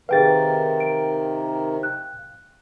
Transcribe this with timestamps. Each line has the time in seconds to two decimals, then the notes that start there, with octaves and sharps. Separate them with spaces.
0.09 C3 D#3 G#4 B4 F5 G5 A6
0.80 D7
1.83 F#6